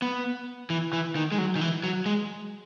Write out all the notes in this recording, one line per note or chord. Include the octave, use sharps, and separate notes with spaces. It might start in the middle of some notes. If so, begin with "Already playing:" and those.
B3
E3
E3
D#3
G#3
F#3
D#3
E3
F#3
G#3